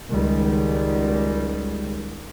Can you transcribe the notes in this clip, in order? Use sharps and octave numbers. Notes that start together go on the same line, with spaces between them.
C#2 D#3 G3 G#3